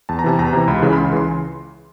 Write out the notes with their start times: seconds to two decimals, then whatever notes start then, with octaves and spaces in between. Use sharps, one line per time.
0.09 E2 A5
0.19 A#5
0.24 C3 E3 A5
0.39 E2 A#5
0.53 C3 E3
0.68 C#2 B5
0.82 C#3 E3
0.93 B5
0.97 C#2 C6
1.13 C#3 E3 C6